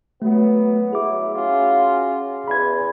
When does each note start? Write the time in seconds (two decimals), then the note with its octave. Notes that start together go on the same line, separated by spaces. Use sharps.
0.22 F#3 A3 B3
0.93 F#3 E4 G#4 D6
1.35 C#4 F4 F#4
2.48 E2 B5 G#6